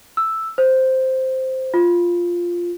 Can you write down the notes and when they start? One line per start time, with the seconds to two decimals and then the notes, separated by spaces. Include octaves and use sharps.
0.17 E6
0.58 C5
1.74 F4